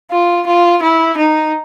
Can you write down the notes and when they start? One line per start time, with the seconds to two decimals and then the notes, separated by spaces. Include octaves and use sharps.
0.11 F4
0.46 F4
0.82 E4
1.17 D#4